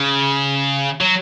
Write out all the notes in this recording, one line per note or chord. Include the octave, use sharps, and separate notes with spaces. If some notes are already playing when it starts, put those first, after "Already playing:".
Already playing: C#3
F#3